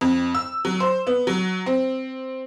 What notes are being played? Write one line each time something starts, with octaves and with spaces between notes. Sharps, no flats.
F2
E6
F#3
C5
B3
F#3
C4